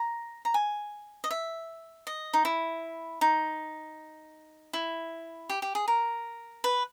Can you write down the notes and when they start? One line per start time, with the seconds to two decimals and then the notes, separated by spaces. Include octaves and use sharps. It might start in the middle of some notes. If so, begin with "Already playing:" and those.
Already playing: A#5
0.45 A#5
0.54 G#5
1.24 D#5
1.31 E5
2.07 D#5
2.34 D#4
2.45 E4
3.21 D#4
4.73 E4
5.50 G4
5.62 G4
5.75 G#4
5.88 A#4
6.64 B4